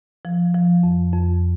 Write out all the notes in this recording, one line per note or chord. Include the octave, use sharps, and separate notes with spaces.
F3
F3
F2
F2